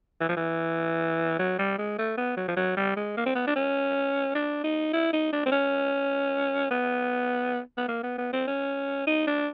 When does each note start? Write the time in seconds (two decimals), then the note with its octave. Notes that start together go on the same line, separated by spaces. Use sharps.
0.21 E3
0.29 F3
0.37 E3
1.39 F#3
1.59 G3
1.78 G#3
1.99 A3
2.17 B3
2.37 F#3
2.48 F3
2.56 F#3
2.77 G3
2.96 G#3
3.17 A#3
3.26 C4
3.35 B3
3.47 D4
3.56 C#4
4.35 D4
4.64 D#4
4.93 E4
5.13 D#4
5.32 D4
5.46 C4
5.52 C#4
6.71 B3
7.77 B3
7.88 A#3
8.03 B3
8.18 B3
8.33 C4
8.47 C#4
9.07 D#4
9.27 D4